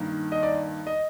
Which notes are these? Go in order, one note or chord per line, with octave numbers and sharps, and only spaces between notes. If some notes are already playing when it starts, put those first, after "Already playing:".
Already playing: G2 D#3 A#3
D#5
D5
D#5